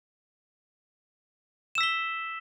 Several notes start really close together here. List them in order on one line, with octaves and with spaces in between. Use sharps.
E7 E6 B6 G7